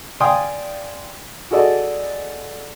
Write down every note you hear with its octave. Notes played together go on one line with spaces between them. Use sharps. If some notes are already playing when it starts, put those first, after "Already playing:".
D5 F5 G5 G#5 C6 D#6
F#4 G#4 A4 D5 D#5